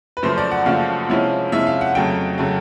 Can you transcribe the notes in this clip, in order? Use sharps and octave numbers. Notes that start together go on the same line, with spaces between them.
B4
F#2 C#3 F3 A3 C5
D5
F#5
F#2 C#3 F3 A3 F5
C3 F3 G#3 C#4 E4
C3 F3 G#3 C#4 E4 E5
F5
F#5
F2 C#3 F#3 A3 G5
C#3 F#3 A3